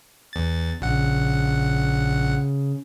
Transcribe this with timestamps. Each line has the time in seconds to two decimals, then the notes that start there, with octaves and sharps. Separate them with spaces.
0.33 E2 A6
0.81 A#1 C#3 F#5